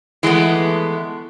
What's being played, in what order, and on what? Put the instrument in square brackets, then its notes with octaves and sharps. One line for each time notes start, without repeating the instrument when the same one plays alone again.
[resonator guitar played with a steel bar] E3 G#3 A3 B3